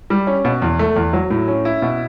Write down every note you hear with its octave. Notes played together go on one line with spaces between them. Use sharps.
G3
C#4
B2
E2
A3
E2
F#3
A2
C#4
E4
B2